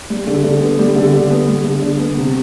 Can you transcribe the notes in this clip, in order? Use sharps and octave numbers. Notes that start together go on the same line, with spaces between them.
G3
D3
D3
B3
G3
D3
D3
B3
G3
D3
D3
B3
C3